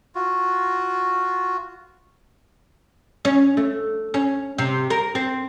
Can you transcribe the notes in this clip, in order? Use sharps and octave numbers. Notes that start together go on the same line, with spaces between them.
F4 F#4
C#4
A3
C#4
C3
A#4
C4